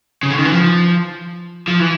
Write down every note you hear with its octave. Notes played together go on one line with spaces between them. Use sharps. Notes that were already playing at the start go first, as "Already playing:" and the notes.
C#3
D3
D#3
E3
F3
F3
E3